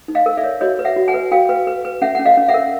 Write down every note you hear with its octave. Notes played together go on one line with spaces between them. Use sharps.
D#4
D#5 F5
A#4
D5 E5
C#5
F#4 C#5 D#5
B4
E5 F#5
F#4
F#5 G#5
B4
F#4 F5 G5
B4
B4
B4
C#4 E5 F#5
C#4 F#5
D#5 F5
C#4
E5 F#5
A#4